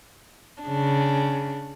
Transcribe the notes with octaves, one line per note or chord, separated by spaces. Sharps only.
C#3 D4